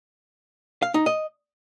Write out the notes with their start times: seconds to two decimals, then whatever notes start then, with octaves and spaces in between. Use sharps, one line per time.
0.82 F5
0.94 D#4
1.06 D#5